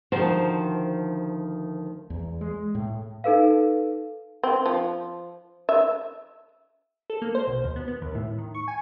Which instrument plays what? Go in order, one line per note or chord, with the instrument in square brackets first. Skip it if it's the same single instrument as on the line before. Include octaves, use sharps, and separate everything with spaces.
[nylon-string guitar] D2 D#3 F3 F#4 C5 A5
[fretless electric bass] E2
G#3
A2
[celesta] D#4 A4 B4 F5
[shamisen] C4
F3
E5
[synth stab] A4
A#3
C5
B1
D#2
B3
B3
D#2
A2
D#3
C#6
G#5